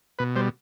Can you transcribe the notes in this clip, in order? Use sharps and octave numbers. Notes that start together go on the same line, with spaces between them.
B2 B4
G3 C5